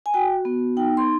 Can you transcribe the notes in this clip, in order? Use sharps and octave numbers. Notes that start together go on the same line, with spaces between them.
G#5
F#4 G5
B3
D#4 G5
C6